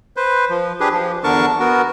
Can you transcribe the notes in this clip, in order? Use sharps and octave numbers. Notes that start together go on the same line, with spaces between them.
B4 C5
F3
D4 G4 G#4 B4
F3
E2 D3 D4 A#4 A5 C#6
B3 F#4 A#4